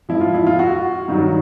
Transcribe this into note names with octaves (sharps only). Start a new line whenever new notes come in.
G#2 F3 E4
F4
E4
F4
F#4
G2 D#3 F#3